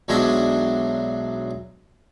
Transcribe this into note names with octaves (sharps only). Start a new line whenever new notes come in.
B1 F#3 G#3 D4 D#5 E5